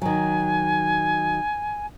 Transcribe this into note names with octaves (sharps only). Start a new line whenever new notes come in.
D#3 F#3 G#5